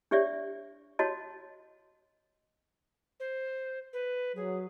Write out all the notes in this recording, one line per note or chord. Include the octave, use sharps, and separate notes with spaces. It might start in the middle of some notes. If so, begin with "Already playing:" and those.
D4 G4 C#5 D5 E5
F#4 C#5 D#5 A5
C5
B4
F#3 G#4